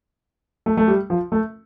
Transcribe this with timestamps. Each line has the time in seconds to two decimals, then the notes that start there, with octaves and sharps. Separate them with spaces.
0.66 A3
0.77 A3
0.88 G3
1.10 F3
1.32 A3